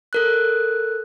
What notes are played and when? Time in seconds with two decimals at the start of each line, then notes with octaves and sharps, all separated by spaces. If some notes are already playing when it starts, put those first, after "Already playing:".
0.13 A4 A#4 F#6